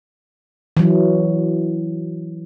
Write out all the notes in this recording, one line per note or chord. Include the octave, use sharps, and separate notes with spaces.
E3 F#3